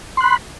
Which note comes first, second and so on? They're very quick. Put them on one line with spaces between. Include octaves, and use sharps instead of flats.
C6 F#6 B5